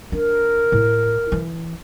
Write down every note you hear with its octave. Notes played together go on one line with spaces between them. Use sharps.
D4 A#4
A2
E3